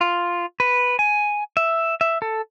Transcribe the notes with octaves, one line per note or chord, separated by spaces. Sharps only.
F4
B4
G#5
E5
E5
A4